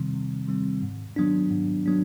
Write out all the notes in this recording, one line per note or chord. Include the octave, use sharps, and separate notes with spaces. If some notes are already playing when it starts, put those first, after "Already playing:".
Already playing: C3 D#3 G3 C4
C3
D#3 G3 C4
G#2
D#3 F#3 B3 D4
G#2
F#3 B3 D4